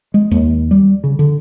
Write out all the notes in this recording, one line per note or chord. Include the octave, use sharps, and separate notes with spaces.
G#3
D#2
G3
C#3
D3